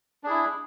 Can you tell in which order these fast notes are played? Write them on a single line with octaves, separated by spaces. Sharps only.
D4 G#4 E4